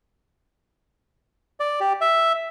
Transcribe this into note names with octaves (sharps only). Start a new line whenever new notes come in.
D5
G4
E5